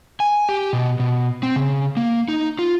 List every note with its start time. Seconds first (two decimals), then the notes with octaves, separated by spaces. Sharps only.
0.20 G#5
0.49 G4
0.73 B2
1.00 B2
1.43 C4
1.56 C#3
1.97 A#3
2.28 D#4
2.59 F4